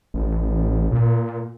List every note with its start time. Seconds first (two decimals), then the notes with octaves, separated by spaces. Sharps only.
0.14 A1
0.91 A#2